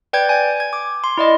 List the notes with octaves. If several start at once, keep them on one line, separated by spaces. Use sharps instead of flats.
B4 D5 G5 G6 G#6
G#5 G#6
G#6
D6
C6
E4 D5 D#5 C6